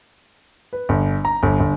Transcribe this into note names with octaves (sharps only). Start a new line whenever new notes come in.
B4
G1
A#5
G1
G1